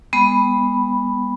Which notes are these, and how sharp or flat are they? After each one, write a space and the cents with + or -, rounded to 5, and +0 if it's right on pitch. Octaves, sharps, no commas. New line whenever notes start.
G#3 -45 B3 -10 B5 +0